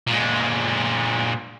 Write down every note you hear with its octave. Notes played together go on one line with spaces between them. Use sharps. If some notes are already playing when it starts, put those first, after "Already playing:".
A#2 G#3